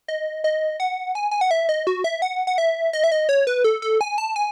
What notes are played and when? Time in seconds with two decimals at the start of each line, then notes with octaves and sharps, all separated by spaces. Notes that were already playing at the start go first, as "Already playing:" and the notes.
0.08 D#5
0.44 D#5
0.80 F#5
1.15 G#5
1.31 G#5
1.41 F#5
1.51 E5
1.69 D#5
1.87 F#4
2.04 E5
2.22 F#5
2.47 F#5
2.58 E5
2.93 D#5
3.04 E5
3.11 D#5
3.29 C#5
3.47 B4
3.64 A4
3.82 A4
4.01 G#5
4.18 A5
4.36 G#5